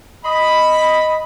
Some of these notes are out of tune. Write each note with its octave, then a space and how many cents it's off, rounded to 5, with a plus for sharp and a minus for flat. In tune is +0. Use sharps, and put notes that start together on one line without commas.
D#5 +0 B5 +0